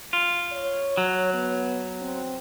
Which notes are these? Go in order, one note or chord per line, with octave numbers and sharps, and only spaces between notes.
F4
C#5
F#3
B3
C4